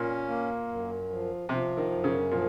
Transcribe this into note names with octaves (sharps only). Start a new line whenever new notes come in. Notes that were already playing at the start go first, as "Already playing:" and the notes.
Already playing: A#2 C#4
A#3
F#2
F3
C3 F3
D#3
F#2
C#3
A#2 F3